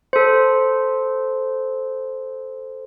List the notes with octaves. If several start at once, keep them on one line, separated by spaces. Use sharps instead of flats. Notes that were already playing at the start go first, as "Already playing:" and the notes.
A4 C5